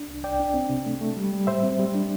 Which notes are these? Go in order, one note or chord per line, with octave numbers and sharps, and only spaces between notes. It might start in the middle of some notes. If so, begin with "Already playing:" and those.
Already playing: D4
C2
C2 D5 G5
D4
C4
C3
A3
A3
G3
G3
A2 C5 E5
C4
G3
D4